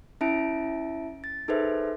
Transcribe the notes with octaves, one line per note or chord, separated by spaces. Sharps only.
C#4 E4 E5 A5 D7
A6
D#4 G#4 A4 B4 C5 E5